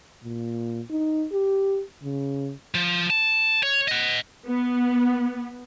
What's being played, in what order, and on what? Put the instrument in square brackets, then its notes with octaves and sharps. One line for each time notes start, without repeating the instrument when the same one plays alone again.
[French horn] A#2
D#4
G4
C#3
[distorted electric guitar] F3
A5
C#5
D#5 F#5
[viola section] B3